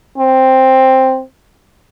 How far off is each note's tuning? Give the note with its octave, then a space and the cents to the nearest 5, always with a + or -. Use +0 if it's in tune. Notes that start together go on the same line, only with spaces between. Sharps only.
C4 +5